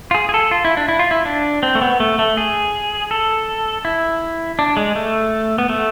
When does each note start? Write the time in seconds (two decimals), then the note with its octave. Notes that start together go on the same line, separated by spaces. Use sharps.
0.11 F4
0.15 G#4
0.29 G#4
0.34 A4
0.51 F4
0.65 E4
0.77 D4
0.88 E4
0.99 F4
1.11 E4
1.26 D4
1.63 C4
1.75 A3
1.82 B3
2.00 A3
2.19 A3
2.37 G#4
3.11 A4
3.85 E4
4.59 D4
4.77 G#3
4.96 A3
5.58 B3
5.69 A3